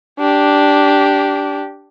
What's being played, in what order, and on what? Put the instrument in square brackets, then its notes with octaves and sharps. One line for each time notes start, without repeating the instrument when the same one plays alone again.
[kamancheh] D4 G4